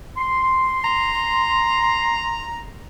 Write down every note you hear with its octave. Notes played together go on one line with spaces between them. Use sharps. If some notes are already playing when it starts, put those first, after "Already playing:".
C6
A#5